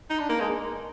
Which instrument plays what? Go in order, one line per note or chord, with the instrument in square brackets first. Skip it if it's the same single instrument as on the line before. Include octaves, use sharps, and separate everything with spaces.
[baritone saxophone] D#4
D4
A#3
G#3